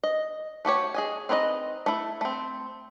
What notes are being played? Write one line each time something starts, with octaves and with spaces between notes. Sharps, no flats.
D#5
A3 F#4 G4 C#5
G#4 D#5 G#5
C4 D#4 B4 C#5 D#5
A3 E4
A3 C4